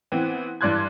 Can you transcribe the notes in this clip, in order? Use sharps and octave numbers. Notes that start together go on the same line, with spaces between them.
E3 B3 C4
G2 E3 D5 C6 F#6 G#6